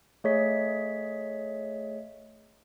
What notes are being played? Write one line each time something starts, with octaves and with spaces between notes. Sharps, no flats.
A3 G#4 C#5 D#5 B6